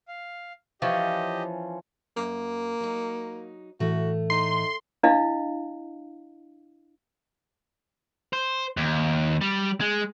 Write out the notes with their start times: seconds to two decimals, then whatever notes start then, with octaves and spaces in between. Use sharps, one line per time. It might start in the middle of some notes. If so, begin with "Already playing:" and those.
0.08 F5
0.82 E3 F3 C#4 G4 D#5
2.17 F#2 A#3
2.80 F#3 D#4
3.80 A2 E3 A3 F#4
4.30 D#4 C6
5.03 D4 E4 D#5 F5
8.33 C5
8.77 D#2
9.41 G3
9.81 G#3